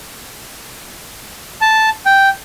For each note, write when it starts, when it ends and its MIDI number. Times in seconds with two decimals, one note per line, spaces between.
1.61 1.89 81
2.06 2.29 79